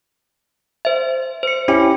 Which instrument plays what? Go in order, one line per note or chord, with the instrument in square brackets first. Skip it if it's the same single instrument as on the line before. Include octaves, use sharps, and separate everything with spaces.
[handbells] C5 E5
C5 C#7
[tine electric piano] C#4 E4 G4